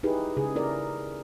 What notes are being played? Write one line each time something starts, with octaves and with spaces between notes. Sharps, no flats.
D#4 E4 G4 G#4 B4
C#3 G#4
E4 A#4 D5